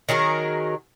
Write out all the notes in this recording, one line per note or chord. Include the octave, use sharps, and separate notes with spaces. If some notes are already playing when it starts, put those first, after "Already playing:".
D#3 F#3 G#4 A#4